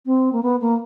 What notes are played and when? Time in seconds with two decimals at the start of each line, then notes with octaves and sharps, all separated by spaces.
0.06 C4
0.33 A#3
0.43 B3
0.61 A#3